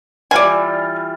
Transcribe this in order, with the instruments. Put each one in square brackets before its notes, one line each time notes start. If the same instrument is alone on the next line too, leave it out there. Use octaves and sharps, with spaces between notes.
[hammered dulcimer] E3 G3 F4 [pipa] D5 G#5